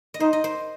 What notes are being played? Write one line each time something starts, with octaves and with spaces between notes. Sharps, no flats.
D#5
D#4 C5
D#5
C5